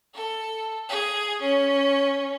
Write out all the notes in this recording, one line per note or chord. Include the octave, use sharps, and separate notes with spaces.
A4
G#4
C#4